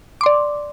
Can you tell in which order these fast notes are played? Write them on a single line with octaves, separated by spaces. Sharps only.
D6 C6 D5